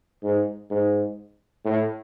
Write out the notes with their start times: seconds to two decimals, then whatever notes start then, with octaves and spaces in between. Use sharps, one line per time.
0.23 G#2
0.71 G#2
1.65 A2